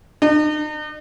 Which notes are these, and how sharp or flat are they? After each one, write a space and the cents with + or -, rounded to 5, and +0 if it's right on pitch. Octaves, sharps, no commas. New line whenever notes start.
D#4 -45